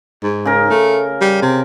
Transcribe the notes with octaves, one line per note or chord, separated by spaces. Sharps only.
G#2
C#3 A#4
A3
G3
C3